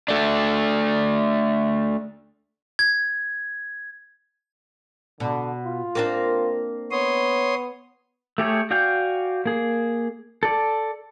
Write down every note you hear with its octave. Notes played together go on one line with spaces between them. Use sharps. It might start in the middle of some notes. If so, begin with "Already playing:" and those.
A3 D4
G#6
B2 D3
F4
A#3 C4 D4
B3 C#5 C6 D#6
A3 G4 G#4 C#5
F#4 D5 F5 G5 G#5
A#3 G#4
A4 D5